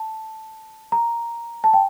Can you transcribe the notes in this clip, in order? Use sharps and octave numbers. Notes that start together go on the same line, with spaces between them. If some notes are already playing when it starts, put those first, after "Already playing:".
Already playing: A5
A#5
A5
G5